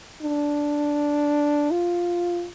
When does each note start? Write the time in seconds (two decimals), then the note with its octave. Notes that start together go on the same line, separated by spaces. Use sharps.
0.22 D4
1.71 F4